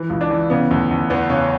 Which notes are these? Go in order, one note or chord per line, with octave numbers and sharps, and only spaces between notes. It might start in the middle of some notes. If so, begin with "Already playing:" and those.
Already playing: E3
C#2
D4
E3
C#3 B3
D2
D2
E2 B3
C#3 C#4